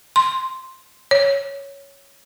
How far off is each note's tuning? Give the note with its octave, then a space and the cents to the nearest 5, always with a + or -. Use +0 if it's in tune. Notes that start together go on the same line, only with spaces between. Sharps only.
C6 -5
C#5 +5